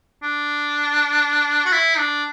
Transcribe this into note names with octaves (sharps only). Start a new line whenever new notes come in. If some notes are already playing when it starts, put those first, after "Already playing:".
D4
F#4
E4
D4